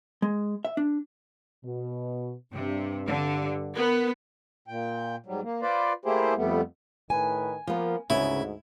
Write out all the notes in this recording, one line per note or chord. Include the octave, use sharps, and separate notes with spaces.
G#3
E5
D4
B2
G2 C3
D3
B3 A#4
A#2 G5
G#2 F#3 G3
A#3
F4 B4 C5 D5
A3 A#3 E4 G4 G#4 C5
F2 G3 A3 B3
A2 D#3 B4 G#5
F3 A#3 B3
D2 G#2 C#3 B3 E4